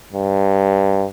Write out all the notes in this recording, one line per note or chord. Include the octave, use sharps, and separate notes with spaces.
G2